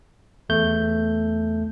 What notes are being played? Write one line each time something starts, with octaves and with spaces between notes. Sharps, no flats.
E2 A3 G6